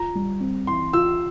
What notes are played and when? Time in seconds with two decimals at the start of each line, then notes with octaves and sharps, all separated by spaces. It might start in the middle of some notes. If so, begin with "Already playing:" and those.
Already playing: F4 A#5
0.15 G3
0.40 C4
0.67 E3 C6
0.93 F4 E6